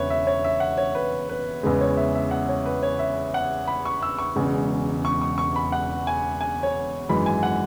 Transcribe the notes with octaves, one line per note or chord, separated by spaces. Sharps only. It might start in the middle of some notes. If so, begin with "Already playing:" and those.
Already playing: E1 E2 C#3 B4 C#5 E5
E5
C#5
E5
F#5
C#5
B4
B4
E2 C#3 G#3 B4
C#5
E5
E5
F#5
C#5
B4
C#5
E5
F#5
B5
C#6
E6
C#6
E1 E2 C#3 G#3
C#6
C#6
C#6
B5
F#5
G#5
G#5
C#5
G#1 F#2 E3 G#3 B5
G#5
F#5